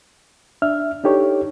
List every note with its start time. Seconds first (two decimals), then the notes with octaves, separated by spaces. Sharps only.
0.62 D4 E5 F6
1.04 D4 D#4 G4 A4 C#5